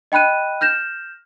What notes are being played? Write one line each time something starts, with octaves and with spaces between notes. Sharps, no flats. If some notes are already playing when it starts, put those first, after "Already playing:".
D#5 G5 B5 F#6 D#7
F6 G6 A#6 E7